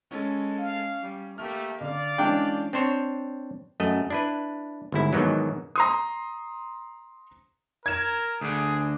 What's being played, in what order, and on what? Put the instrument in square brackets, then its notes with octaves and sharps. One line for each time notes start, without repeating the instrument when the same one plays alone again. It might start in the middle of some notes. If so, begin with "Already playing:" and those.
[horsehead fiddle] G#3 A4 [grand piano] C#4
[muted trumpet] F5
[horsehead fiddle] G3
[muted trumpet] A3 [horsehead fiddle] A#3 G4 [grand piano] F6
[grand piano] D3 [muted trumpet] D5 [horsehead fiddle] F5
[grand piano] E3 G#3 C#4 [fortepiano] D4 G5
[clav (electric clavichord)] C4 D4 C5 C#5
F#2 A3 D#5
D4 E4 B4
G1 G#2 E4
G#2 B2 D#3 E3 F#3
[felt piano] A#5 C6 D#6
[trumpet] A#4 [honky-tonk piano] G#6 E7
[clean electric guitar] D2 D3 [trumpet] G#4